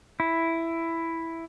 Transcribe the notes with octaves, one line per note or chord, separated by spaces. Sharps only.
E4